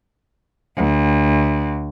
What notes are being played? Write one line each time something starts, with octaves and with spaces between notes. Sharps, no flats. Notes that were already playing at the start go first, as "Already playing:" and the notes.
D2